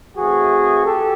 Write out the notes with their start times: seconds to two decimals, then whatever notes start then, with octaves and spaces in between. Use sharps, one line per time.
0.16 E3 A3 C4 F#4 G#4
0.85 G4 A4